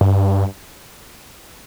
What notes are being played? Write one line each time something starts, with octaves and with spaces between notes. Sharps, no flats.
G2